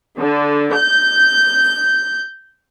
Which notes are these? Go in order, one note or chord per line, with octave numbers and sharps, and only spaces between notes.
D3
G6